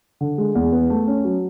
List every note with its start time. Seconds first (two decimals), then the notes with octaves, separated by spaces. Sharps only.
0.21 D3
0.38 G#3
0.55 E2
0.72 B3
0.90 A3
1.08 C#4
1.24 F#3